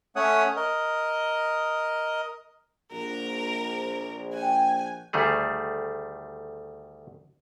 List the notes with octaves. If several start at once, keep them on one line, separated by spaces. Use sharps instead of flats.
A3 C#4 C#5 F#5 D#6
A#4 D#5
A#1 F#4 A#4
F#4 G5 G#5
D2 D#3 G3 A3 G#4